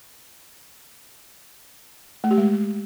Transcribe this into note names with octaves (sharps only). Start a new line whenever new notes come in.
A3
G4
G#3